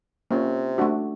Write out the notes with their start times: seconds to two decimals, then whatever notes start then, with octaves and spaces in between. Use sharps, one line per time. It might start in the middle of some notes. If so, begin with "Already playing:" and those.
0.31 C3 A#3 C#4 F4
0.78 A3 D4 F#4